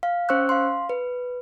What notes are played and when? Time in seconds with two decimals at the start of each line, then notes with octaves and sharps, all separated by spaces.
0.03 F5
0.29 C#4 C5 C#6 E6 F#6
0.49 F5 C6
0.89 B4